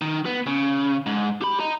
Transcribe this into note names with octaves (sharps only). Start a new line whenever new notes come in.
D#3
B3
C#3
G#2
G4 B5
D#5 A#5